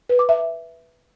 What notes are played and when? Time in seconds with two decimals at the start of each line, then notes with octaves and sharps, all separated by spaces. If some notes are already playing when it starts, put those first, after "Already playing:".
0.09 B4
0.19 D6
0.29 E5